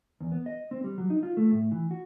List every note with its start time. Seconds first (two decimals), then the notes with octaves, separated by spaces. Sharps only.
0.21 E2
0.32 B3
0.46 D#5
0.71 C4
0.84 G3
0.98 F#3
1.10 D#4
1.23 F4
1.37 A3
1.52 A2
1.71 E3
1.91 F#4